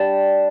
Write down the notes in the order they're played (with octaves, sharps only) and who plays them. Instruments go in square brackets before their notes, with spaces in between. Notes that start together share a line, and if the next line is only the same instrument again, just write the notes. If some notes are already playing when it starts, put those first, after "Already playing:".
Already playing: [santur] G3 D4 A5